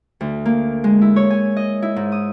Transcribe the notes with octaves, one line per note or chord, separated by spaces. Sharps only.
D2
A#3
G#3
E4
C#5
G#5
D#5
E4
G#2
D#6